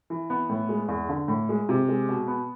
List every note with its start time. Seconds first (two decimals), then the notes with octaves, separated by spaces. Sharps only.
0.10 E3
0.30 B3
0.49 A2
0.69 G#3
0.88 E2
1.09 D3
1.28 A2
1.49 G#3
1.69 C3
1.88 G#3
2.08 B2
2.28 B3